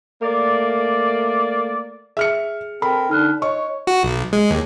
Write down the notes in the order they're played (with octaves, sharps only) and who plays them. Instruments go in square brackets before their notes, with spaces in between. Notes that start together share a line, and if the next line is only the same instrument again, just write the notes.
[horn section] A3 A#3 D5
[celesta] G#4 [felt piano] E5 F6 C#7
[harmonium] C4 A4 A#4 [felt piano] B5
[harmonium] D3 A4 [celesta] D#4 F6 F#6
[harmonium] C#5 [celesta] D#5 [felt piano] C#6
[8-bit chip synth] F#4
B1
G#3
D#2